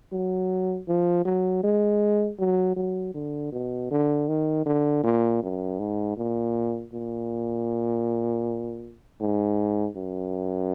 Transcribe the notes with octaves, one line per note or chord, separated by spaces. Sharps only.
F#3
F3
F#3
G#3
F#3
F#3
D3
B2
D3
D#3
D3
A#2
F#2
G#2
A#2
A#2
G#2
F#2